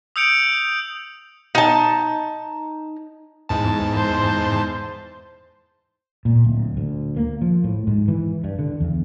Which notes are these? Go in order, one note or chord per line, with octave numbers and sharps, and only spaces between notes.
D#6 E6 G6 C#7 D7 F7
D#4 A5
E2 G#2 A5
C5
A#2
D1
D2
A#3
F3
A2
G#2
E3
G2
D3
E2